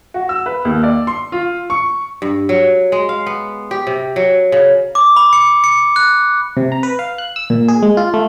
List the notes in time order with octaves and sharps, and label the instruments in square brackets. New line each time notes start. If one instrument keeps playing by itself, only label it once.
[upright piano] F#4
E6
B4
D#2
D5
C6
F4
C#6
[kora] G2
F#3
G#3
F5
B3
G4
C3
F#3
C#3
[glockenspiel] D6
B5
C#7
C#7
F#6
[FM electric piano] C3
A#5
B4
F5
F#6
E6
A#2
G#4
G#3
F4
A3